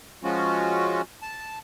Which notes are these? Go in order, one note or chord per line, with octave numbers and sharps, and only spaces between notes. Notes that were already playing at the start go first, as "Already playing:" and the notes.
F3 G#3 C#4 F4 F#4
A5